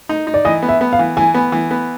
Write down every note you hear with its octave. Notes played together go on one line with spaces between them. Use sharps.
D#4
D#4
D5
E3 D#5
B3
E5
B3
F5
E3
E3 G#5
B3
E3
B3